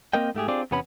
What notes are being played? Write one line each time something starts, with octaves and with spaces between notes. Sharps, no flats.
A#3 C4 A#4 D#5 G5
G#2 A3 G4 G#4
C4 D4 F4 G4 G#4 D5
E2 C3 B3 C#4 B5